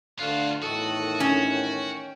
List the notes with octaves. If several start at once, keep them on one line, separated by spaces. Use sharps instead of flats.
D2 D3 F4 F#4 F5 F#6
E2 A2 D#3 F#4 A4 D#6
C#4
G5